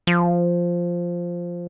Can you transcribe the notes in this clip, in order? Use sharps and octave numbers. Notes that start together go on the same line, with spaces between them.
F3